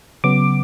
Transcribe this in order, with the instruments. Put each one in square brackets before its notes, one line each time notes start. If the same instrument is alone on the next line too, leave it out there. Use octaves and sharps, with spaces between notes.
[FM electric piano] C#3 F#3 B3 D6